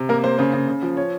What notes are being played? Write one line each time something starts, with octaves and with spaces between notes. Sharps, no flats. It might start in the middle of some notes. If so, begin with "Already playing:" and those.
Already playing: C3
A#3 A#4
A#3 C5
C#3 C5
C#3
C#3
F3
C#5